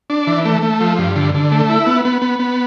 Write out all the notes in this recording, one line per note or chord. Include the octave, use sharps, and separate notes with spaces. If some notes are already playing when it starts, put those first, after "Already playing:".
D4
E3
A3
A3
F3
G2
D3
D3
A3
E4
B3
B3
B3
B3